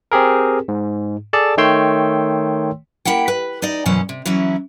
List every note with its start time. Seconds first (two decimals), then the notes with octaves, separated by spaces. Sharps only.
0.12 C4 G4 G#4 A#4
0.68 G#2
1.33 G#4 A4 D5 A5
1.57 D#3 A3 C#5 G5 C6 E6
3.05 A#3 E4 G4 F#5 G5
3.28 B4
3.62 D#4 D5 D#5
3.86 F#2 B2 E3 C#4 C5
4.09 C3
4.25 E3 F#3 C#4 E4